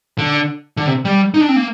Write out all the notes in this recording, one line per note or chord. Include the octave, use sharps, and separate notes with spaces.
D3
D3
C3
G3
D#4
D4
C4
A#3